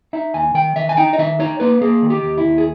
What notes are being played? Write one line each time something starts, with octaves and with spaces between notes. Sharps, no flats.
D#4 E5
D#2 G#5
D#3 G5
D#3 E5
G#5
D#4 G5
D#5
D#3 E5
D#4 C#5
A#3 B4
A#3 G#4
D#3
G4
D#2
E4
D#2
G#4